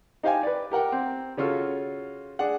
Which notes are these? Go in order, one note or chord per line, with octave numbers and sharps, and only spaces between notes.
D#4 G4 C5 F5 G5 G#5
B4 D5
G4 A#4 F#5 G5
C4
C#3 C#4 F4 F#4 A4
D4 G#4 F#5